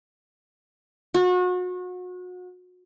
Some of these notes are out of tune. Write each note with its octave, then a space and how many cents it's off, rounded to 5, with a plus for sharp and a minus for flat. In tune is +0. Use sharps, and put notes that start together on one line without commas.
F#4 -35